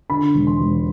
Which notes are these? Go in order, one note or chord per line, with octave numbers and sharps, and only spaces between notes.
D3 B5
E1
C6
E1